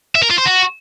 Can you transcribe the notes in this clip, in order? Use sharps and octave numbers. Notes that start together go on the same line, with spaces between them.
E5
A#4
F4
C5
F#4